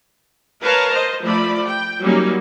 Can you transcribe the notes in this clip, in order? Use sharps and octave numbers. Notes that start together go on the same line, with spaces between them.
A#4 B4 C#5 F5 A5 A#5
C5 D#5
F3 A3 D5 B5
G5
F#3 G3 A#3 C#4 D#4